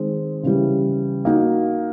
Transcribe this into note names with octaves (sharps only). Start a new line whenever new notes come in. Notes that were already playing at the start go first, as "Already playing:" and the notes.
Already playing: D#3 G#3 C4
C#3 E3 G3
A#3 D#4 F#4